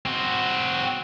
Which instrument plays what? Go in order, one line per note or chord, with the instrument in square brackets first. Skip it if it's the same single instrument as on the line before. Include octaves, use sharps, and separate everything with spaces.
[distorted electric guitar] C4 F#4